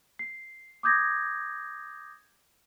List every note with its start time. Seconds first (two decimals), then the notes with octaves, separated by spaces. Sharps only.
0.19 C7
0.83 D6 D#6 G6 G#6 A#6